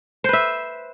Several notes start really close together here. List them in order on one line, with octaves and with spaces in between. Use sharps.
C5 B4 E5